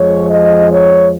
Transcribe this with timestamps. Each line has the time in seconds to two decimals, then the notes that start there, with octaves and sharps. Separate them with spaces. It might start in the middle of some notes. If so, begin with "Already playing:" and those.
Already playing: F2 F3 G#3 C#5
0.29 D#5
0.71 C#5